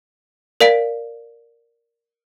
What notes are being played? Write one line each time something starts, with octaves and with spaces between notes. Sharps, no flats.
A#4 D5 F5 B6 D7